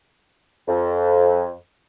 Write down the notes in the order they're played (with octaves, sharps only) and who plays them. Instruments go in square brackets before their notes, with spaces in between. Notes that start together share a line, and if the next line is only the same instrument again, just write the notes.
[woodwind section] F2